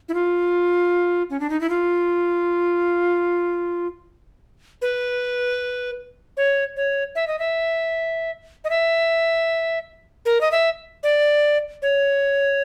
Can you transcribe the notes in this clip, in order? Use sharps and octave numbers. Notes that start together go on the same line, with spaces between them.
E4
F4
C#4
D4
D#4
E4
F4
B4
C#5
C#5
E5
D#5
E5
D#5
E5
A#4
D#5
E5
D5
C#5